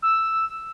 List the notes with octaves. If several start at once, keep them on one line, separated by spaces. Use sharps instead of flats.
E6